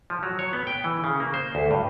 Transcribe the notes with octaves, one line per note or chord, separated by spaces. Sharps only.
F3
F#3
C#5
B3
G5
E3
C#3
A#3
C5
D2
G2